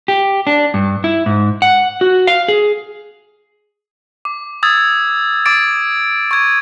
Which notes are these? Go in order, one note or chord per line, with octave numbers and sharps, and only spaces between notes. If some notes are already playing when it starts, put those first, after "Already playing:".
G4
D4
G2
E4
G#2
F#5
F#4
F5
G#4
D6
D#6 E6 G#6 A6
D6 A6 D7
C#6 G#6